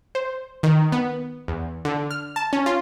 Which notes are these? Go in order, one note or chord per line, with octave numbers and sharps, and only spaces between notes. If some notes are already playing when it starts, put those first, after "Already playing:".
C5
D#3
B3
E2
D3
F6
A5
C#4
F4